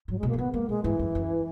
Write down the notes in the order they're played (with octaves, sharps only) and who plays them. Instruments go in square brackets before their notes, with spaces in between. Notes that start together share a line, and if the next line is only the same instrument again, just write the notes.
[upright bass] G#2 [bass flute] F#3
[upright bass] B2 [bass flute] G#3
[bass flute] A#3
[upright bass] E3
[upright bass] D#3 [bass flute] B3
[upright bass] G#3 [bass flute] A#3
[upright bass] B2 [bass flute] G#3
[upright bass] G#2 [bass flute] E3
[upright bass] F#2
F#2